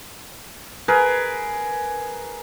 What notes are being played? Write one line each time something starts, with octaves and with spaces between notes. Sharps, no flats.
G#4 A#4 B4